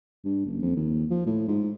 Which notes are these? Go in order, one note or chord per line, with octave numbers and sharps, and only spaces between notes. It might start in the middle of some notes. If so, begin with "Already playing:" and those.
G2
F#1
F2
D#2
F3
A2
G#2